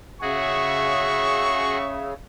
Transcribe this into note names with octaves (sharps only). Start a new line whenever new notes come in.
C#3 F#4 G#4 E5 C#6